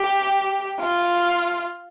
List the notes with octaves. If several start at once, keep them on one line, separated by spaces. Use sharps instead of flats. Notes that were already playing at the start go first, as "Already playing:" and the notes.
Already playing: G4
F4